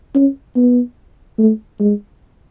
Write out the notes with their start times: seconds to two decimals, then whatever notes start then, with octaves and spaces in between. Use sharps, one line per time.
0.15 C#4
0.56 B3
1.38 A3
1.80 G#3